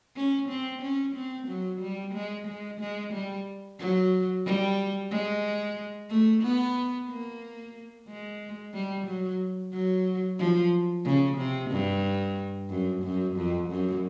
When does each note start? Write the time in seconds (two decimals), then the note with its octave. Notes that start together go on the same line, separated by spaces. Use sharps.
0.16 C#4
0.49 C4
0.82 C#4
1.16 C4
1.48 F#3
1.81 G3
2.14 G#3
2.47 G#3
2.80 G#3
3.13 G3
3.79 F#3
4.45 G3
5.11 G#3
6.10 A3
6.43 B3
7.09 A#3
8.08 G#3
8.74 G3
9.07 F#3
9.73 F#3
10.39 F3
11.05 C#3
11.38 C3
11.71 G2
12.70 F#2
13.03 F#2
13.36 F2
13.70 F#2